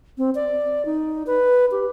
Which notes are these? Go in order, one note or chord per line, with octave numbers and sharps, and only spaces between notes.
C4
D5
D#4
B4
G4